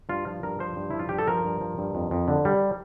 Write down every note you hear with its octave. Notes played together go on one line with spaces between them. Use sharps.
G2 F4
F3
G2 A#4
F3 C5
G2
F3 E4
F4
G2 G4
A4
F3 A#4
G2
F3
G2
F2
F2
D3
G3